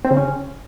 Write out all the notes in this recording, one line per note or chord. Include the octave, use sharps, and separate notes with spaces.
C4
C#3
C#4